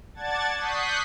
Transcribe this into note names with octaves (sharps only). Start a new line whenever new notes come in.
D5 F#5 A5 G#6 A6
C#6 D#6 F#6 G6 B6 C7